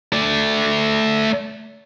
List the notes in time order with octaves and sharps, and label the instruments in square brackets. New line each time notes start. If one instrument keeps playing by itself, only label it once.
[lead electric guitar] A3 D5